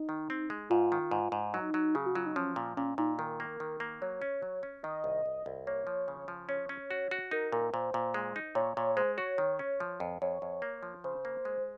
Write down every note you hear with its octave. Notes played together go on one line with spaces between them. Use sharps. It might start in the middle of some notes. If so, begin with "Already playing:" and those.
Already playing: D#4
D#3
C4
G#3
G#2 F4
D#3
G#2
G#2
F#3 D#4
F#3
C#3 G#4
F#4
F#3 F4
D#4
F3 C#4
A#2
A#2 C#4
A#2 D#4
D#3 A#4
A#3
D#3
A#3
F#3 C#5
C#4
F#3
C#4
D#3 D#5
C2
C2
C2
A#3 C#5
F3
C#3
F3
C#4 C#5
C#4
F#4
F#4
D#4 A#4
A#2 A#4
A#2 C5
A#2
G#3
D#4
A#2 C#5
A#2 C#5
G#3 C5
F#4 C#5
D#3
C#4
F3
F2
F2 C#5
F2
A#3
F3
C#3 C5
A#3
G#3